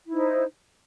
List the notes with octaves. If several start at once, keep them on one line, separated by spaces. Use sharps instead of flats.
D#4 E4 C5